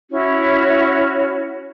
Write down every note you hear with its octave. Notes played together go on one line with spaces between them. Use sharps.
C#4 E4 F#4 C#5